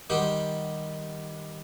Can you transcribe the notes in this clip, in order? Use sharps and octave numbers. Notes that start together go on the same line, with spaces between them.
D#3 G3 G4 C5 F#5 G5